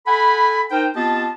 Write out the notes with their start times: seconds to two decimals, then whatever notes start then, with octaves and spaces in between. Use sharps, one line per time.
0.07 A4 F#5 G#5 B5
0.71 D#4 A#4 C5 G5
0.95 B3 C4 F4 G4 D#5 A5